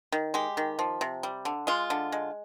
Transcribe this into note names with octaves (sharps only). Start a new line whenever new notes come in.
D#3
G#3 G4
D#3
F3
C3
G3
D3
G#3 F4
D3
G#3